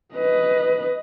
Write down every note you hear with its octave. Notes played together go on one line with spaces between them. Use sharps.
B4 D#5